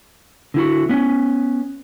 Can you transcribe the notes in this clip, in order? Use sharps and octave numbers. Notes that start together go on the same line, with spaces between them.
D3 E4 F#4
B3 C#4